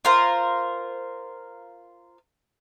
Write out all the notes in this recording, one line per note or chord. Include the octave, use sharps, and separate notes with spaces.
F4 A#4 C5